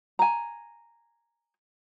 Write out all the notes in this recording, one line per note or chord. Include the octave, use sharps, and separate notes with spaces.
G#5 A#5